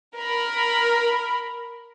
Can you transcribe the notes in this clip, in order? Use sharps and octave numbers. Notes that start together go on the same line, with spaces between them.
A#4 B5